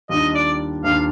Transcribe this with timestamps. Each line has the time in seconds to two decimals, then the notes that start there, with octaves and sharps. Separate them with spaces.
0.09 D#2 D#3 G3 D4 F4 D#5
0.35 D5
0.84 D#2 D#3 G3 D4 F4 F5